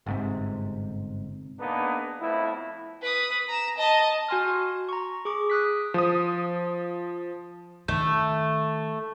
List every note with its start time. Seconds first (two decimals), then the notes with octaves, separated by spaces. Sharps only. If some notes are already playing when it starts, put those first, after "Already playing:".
0.06 G1 G#2 C3
1.59 A#3 B3 D4 D#4 G#4 B4
2.18 F2 A2 B3 E4
3.02 B4 D#6
3.49 A#5 E7
3.78 D#5 A5
4.28 F#4 G#5 C6 F6
4.89 A#5 C#6
5.25 G#4 C#6 D6
5.50 D#6 F#6 B6
5.94 F3 D#6
7.88 D#3 A3